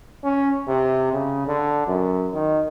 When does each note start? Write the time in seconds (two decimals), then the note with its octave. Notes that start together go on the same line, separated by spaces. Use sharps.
0.24 C#4
0.67 C3
1.13 C#3
1.47 D3
1.87 F#2
2.33 D#3